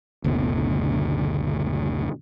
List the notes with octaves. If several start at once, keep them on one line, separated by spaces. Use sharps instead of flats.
F#1 D2 B2 D3